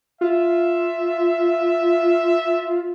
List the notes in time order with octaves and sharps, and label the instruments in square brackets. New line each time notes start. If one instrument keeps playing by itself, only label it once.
[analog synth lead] F4 [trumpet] E5